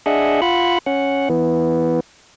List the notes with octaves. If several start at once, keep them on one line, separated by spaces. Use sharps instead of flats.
D4 G#4 D#5 E5 F#5
F4 F#5 B5
C#4 F#5
E3 B3